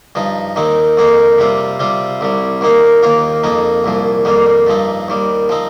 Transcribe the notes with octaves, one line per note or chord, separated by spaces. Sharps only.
G2 F3 D#4
D#2 D#3 C4 D#4
F2 D#3 A#3 D#4
C3 G3 C4 F4
C3 G3 C4 F4
C2 C3 G3
D#2 D#3 A#3 D#4
D#2 D#3 A#3 F4
F2 F3 A#3 D#4
C2 A#2 F3
F2 D#3 G3 A#3
G2 F3 C4 D#4
D#2 D#3 G3
F3 C4 D#4